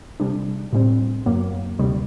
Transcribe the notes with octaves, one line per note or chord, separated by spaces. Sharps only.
C3 G3 D4
A2 G3 C4
F#2 F#3 A#3
D2 C3 D#3 G3